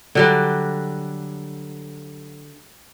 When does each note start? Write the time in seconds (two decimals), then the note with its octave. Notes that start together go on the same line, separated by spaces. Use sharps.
0.15 D3 F#3 G3